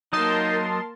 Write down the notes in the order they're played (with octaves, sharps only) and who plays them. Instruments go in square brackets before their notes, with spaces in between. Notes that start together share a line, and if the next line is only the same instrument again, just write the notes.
[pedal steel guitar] F#3 D#5 [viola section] A#3 A#4 [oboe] D#4 [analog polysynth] A5 C6